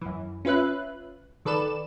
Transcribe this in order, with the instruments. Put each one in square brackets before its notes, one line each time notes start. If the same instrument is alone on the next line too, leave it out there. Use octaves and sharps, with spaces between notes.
[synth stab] F#2 E3
C#4 F4 B4 E5 F#6
D#3 A4 B4 D5 E7